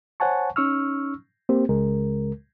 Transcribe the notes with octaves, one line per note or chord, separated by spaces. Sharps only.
C5 C#5 F#5 G#5 A5 C#6
C#4 D#4 C#6 E6 F6
A#3 C4 G4 C5
C#2 C#3 G#3 A#4